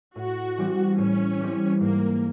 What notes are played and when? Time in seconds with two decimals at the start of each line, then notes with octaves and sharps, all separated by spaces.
0.16 A2 F#4
0.58 E3 G3 C4
0.98 A2 C#4
1.40 E3 G3 C4
1.80 G#2 A#3